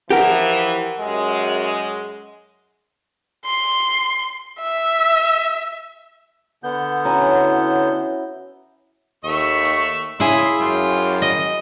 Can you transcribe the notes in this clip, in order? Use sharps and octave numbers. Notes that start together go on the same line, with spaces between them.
E3 F3 G4 A#4 F#5
F#2 G#3
C6
E5
D3 B3 G6
C#4 E4 F#4 C#5 A#5
D#2 A3 E5 C#6
C#3 E4 G#4 E5 C6
F#2 F4 G4
D#5